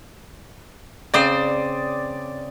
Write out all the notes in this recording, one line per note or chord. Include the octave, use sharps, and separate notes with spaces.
C#3 C4 C5 D5 D#6